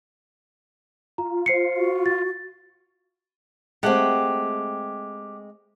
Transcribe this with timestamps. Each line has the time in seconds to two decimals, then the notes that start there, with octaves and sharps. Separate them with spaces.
1.18 F4 A#5
1.46 C5 C7 C#7
1.77 F#4
2.06 A6
3.83 G#3 A3 C4 G4 F#5